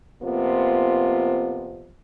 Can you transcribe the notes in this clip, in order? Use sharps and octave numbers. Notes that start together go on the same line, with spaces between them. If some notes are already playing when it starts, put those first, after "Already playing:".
F2 C3 A#3 B3 F4